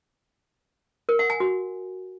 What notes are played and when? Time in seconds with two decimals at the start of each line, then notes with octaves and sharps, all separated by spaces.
1.09 A#4
1.19 F#5
1.30 G#5
1.40 F#4